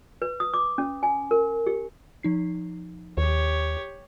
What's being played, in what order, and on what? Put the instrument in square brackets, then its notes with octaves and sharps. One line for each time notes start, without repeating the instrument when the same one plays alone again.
[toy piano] B4
D#6
D6
C#4
G#5
A#4
G4
[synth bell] F3 D#4 C7
[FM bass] D#2 [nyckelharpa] G4 C#5